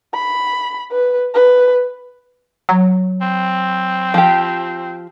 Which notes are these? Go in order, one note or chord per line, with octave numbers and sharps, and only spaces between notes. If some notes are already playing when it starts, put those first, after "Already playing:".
B5
B4
B4
F#3
C4
F3 G4